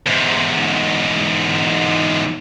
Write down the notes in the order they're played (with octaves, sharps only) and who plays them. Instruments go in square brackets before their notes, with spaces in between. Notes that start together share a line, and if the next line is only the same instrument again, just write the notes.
[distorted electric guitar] E2 G#2